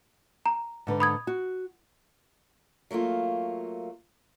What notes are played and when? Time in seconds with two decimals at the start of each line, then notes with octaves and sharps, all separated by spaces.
0.46 A#5
0.87 G#2 D3 B4
1.00 B5 D#6 G#6
1.27 F#4
2.91 F#3 A3 A#3 F4